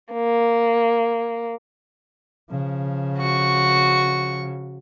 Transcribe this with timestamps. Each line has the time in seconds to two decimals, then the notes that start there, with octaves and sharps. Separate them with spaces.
0.13 A#3
2.50 C#3 F3
3.18 F#4 C#6